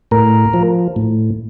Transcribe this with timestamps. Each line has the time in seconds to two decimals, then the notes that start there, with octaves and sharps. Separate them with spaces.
0.11 A2 A#4
0.54 F3
0.96 A2